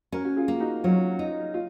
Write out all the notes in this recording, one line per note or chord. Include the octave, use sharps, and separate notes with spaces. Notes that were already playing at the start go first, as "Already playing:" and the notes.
C#4 F#4 A#4
F#4
F4 G#4
A#3
D#4 F#4
F#3 C#4 F4
D#4
F4